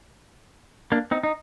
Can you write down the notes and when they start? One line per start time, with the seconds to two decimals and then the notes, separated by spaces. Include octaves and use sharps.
0.92 A#3 D4
1.11 C4 D#4
1.23 D#4